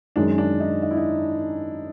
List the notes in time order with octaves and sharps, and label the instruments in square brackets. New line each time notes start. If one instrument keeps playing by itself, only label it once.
[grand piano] F#2 D#3 G#3 [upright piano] D4
[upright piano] D4
D#4
D#4
E4
D#4